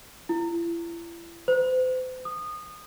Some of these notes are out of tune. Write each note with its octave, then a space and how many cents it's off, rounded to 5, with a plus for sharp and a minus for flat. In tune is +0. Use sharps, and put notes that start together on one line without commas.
E4 +40
C5 -40
D#6 -20